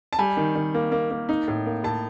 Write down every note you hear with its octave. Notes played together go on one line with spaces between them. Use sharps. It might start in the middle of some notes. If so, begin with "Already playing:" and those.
A5
G3 G#5
D#3
D#3
A#3
A#3
A#3
D#4
A2
A#3
A2 A5